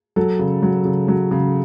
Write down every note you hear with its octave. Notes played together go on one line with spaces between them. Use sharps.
F#3 A4
C#3
F#3
C#3
F#3
C#3